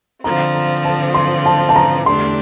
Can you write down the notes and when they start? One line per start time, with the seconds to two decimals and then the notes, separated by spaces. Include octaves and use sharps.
0.23 D3 F3 C4 A#5
0.54 A#5
0.85 A5
1.14 C6
1.46 A5
1.69 A5
1.76 A#5
2.06 E2 D3 A3 D4 G4 C6